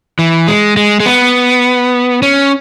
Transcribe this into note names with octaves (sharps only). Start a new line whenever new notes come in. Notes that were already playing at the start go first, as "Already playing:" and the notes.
E3
G#3
G#3
G#3
B3
C#4